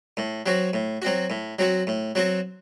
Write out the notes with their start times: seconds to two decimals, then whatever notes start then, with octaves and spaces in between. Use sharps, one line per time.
0.17 A2
0.46 F#3 C4 F#4
0.73 A2
1.02 F#3 C4 F#4
1.30 A2
1.59 F#3 C4 F#4
1.87 A2
2.15 F#3 C4 F#4